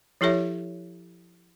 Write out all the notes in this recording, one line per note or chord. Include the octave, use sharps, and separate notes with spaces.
F3 E4 G4 A4 C#5 E5